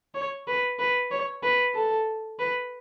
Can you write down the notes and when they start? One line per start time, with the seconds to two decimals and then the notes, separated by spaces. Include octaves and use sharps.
0.14 C#5
0.47 B4
0.79 B4
1.11 C#5
1.43 B4
1.74 A4
2.39 B4